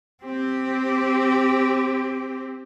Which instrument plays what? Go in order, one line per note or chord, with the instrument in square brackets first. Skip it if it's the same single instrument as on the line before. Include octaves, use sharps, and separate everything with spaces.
[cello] C4 G4